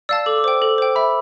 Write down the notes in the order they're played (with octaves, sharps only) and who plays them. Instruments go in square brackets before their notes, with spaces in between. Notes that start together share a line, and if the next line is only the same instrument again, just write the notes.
[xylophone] D5 F5 A5 [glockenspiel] E6
[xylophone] A4 [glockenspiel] D6
[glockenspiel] D6
[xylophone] C5 G5
A4
C5 G5
[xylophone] E5 [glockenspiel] B5